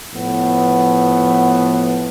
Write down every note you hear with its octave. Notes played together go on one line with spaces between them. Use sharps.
A2 F3 B3